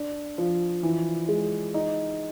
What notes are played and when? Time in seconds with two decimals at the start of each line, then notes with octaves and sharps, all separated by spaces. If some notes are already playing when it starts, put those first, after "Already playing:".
Already playing: D4
0.38 F3
0.83 E3
1.29 G#3
1.74 D#4